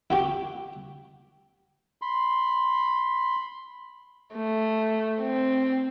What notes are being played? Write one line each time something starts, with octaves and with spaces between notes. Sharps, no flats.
E4 F#4 G4
B5 C6
A3
C4